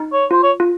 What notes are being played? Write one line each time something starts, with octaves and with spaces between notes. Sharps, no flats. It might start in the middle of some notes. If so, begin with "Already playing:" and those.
Already playing: D#4
C#5
F4 C5
C#5
F4